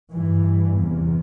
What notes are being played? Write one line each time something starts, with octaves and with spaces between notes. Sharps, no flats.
G2 E3
E2 C3